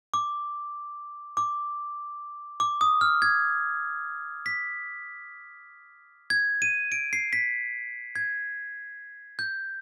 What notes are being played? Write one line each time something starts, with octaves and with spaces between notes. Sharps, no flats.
D6
D6
D6
D#6
F6
G#6
B6
G#6
D#7
D7
C7
B6
G#6
G6